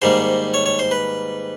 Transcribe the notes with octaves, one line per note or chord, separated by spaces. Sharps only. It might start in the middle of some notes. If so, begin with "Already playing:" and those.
G#2 D#3 G3 A#3 C5
C#5
C#5
C5
B4